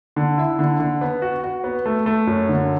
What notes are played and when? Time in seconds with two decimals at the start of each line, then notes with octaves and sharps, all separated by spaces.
0.16 D3
0.38 E4
0.59 D3
0.80 D3
1.01 B3
1.22 F#4
1.44 F#4
1.64 B3
1.86 A3
2.06 A3
2.27 F#2
2.49 D3